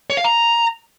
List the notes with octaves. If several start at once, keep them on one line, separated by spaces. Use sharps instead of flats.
C#5
F5
A#5